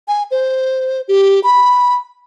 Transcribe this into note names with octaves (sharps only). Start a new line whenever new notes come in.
G#5
C5
G4
B5